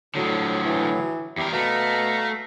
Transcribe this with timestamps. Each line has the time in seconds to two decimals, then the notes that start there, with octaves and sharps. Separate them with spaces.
0.15 A2 D3 F3 F#3
0.66 E3
1.37 E2 E4 G4 A#4
1.53 B2 A3 F5 A#5